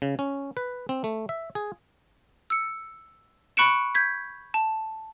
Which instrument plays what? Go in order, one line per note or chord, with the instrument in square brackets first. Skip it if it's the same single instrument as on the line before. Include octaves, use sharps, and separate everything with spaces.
[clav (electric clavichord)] C#3
C#4
B4
C4
A3
E5
G#4
[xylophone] E6 C#7
B5 C#6 F#6 C#7 D7 E7
G6 G#6 B6
A5